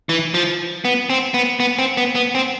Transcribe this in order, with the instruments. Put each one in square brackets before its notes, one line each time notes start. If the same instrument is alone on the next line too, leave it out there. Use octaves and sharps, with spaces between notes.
[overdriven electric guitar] E3
F3
B3
C4
B3
B3
C4
B3
B3
C4